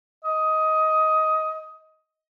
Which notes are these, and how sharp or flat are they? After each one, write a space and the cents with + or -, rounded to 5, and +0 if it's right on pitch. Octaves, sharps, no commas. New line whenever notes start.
D#5 +15